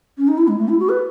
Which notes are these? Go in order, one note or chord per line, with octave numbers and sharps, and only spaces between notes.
C#4
D#4
E4
G#3
A3
E4
F#4
B4